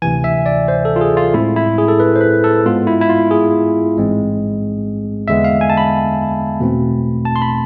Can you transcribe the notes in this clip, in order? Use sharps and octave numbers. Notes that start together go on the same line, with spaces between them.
D2 C3 E3 G#5
E5
D5
C5
A4
F4
G#4
F4
A2 G#3 C4 E4
E4
G#4
A4
B4
C5
B4
A4
G#2 G#3 B3 F4
E4
E4
F4
G#4
A1 G#2 G#3 C4
E2 D3 G#3 B3 E5
F5
G#5
A5
B5
E2 B2 A3 C4
A5
C6
B5